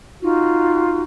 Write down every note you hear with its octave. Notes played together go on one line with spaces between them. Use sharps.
D#4 F4 F#4